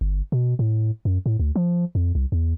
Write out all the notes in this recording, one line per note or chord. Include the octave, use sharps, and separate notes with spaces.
G1
B2
A2
F#2
A2
D2
F3
F2
C2
E2